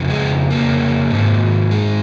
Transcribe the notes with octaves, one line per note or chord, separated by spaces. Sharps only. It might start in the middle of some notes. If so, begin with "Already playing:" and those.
Already playing: F2 C#3
G#3
A#3
G#2 D#3
G#3